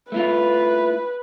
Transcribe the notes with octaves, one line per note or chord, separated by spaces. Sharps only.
A3 E4 F4 B4